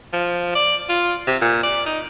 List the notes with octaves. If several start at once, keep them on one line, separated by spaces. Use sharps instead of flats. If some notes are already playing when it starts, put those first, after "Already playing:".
F3
D5
F4
C3
A#2
D5
D#4